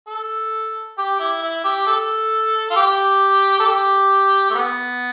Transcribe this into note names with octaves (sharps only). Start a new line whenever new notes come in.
A4
G4
E4
E4
G4
A4
F4
G4
A4
G4
A3
B3